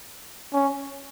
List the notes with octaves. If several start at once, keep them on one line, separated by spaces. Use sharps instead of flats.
C#4